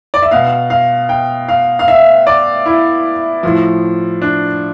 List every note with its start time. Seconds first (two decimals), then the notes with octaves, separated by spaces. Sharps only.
0.14 D5
0.22 E5
0.31 B2 F5
0.70 F5
1.09 G5
1.48 F5
1.79 F5
1.88 E5
2.27 D5
2.66 E4
3.43 A2 F3
4.22 D4